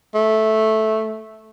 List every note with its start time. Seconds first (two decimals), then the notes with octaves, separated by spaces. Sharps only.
0.14 A3